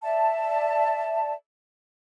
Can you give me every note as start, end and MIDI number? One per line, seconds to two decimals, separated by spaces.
0.03 1.33 74
0.03 1.33 76
0.03 1.33 81